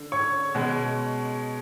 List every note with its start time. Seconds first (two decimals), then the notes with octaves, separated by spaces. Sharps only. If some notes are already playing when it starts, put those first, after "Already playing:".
Already playing: D3
0.12 C#5 C#6
0.55 B2 G#3